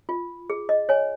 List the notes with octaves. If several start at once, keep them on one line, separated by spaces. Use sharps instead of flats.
F4
G#4
D#5
C#5 G#5